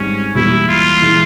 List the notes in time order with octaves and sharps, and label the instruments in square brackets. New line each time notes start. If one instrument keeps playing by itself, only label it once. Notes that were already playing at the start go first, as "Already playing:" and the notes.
Already playing: [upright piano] G#1 G#2 G3 C4 [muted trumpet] C#4
[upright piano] E2 E3 G3 A#3 [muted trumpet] E4
[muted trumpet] F4
[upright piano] E3 G#3 E4